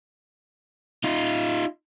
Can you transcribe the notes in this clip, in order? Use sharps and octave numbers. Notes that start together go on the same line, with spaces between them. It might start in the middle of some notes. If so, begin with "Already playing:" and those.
D#4 F4